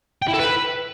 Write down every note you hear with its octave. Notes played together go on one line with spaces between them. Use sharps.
G5
E4
A4
B4